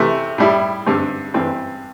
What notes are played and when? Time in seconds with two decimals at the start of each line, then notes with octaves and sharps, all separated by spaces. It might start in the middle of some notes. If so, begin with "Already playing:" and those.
Already playing: C3 E3 A3
0.38 A2 G3 E4
0.86 G2 D3 C4
1.34 G2 E3 C4